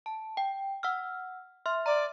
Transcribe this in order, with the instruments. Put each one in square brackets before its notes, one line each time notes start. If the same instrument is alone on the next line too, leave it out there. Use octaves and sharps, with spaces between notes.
[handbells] A5
G5
F#5 E6 F6
E5 C6 F6
[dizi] D5 [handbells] A#5